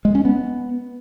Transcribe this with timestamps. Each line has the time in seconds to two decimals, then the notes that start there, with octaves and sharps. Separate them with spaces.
0.05 G#3
0.15 C#4
0.25 B3